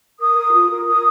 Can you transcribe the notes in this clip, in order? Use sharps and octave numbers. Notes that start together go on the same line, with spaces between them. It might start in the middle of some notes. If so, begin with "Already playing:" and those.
A#4 D#6
A#4
F4
A#4
A#4 D#6